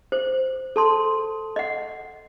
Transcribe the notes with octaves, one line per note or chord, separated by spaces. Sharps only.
C5
A4 A5 C6
D#5 F#5